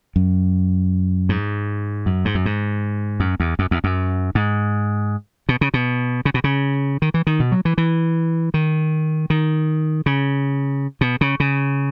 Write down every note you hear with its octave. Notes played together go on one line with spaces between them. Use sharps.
F#2
G#2
F#2
G#2
F#2
G#2
F#2
E2
F#2
E2
F#2
G#2
B2
C#3
B2
C#3
B2
C#3
D#3
E3
D#3
B2
F#3
E3
E3
D#3
D#3
C#3
B2
C#3
C#3